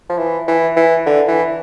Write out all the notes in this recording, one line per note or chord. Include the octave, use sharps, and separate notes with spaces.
F3
E3
E3
E3
D3
E3